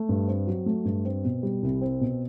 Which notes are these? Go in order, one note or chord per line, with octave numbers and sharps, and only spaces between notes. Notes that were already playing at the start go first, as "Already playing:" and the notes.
Already playing: A3
G2
C4
F#3
A3
G2
C4
B2
G3
C2
C4
B2